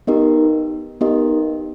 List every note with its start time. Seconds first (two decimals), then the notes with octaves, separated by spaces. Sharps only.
0.07 B3 D#4 G4 A#4 D#5
1.01 B3 D#4 G4 A#4 D#5